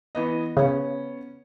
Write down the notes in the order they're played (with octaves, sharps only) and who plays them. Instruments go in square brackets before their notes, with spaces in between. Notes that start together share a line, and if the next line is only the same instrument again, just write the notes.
[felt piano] E3 B3 D#5
[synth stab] C#3 [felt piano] B3 C#4